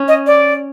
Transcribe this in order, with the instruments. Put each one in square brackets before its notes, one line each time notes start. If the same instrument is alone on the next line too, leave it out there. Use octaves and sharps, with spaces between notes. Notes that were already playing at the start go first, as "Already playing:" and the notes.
Already playing: [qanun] C#4
[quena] D#5
D5